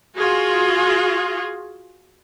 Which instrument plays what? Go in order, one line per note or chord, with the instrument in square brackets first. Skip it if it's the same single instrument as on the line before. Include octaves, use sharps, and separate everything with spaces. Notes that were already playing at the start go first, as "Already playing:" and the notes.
[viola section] F4 F#4 G#4